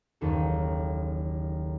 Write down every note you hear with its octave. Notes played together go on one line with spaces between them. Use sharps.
F#1 D#2 A4